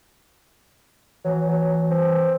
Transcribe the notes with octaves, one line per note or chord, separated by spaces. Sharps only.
E3 F#3
F#3
C4